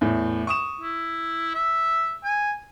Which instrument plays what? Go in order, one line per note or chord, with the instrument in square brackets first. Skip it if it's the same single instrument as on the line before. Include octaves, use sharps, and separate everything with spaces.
[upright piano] E2 A2
C#6 D#6 E7
[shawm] E4
E5
G#5